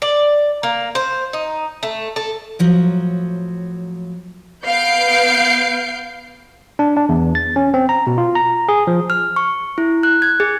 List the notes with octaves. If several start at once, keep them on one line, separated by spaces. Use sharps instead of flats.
D5
A#3
C5
D#4
A3
A4
A2 F3 F#3
B3 F5 G6 C7 D7
D4
D4
E2
A6
C#4
C4
A#5
B2
F4
A#5
G#4
F3
F6
C#6
E4
F#6
G#6
G#4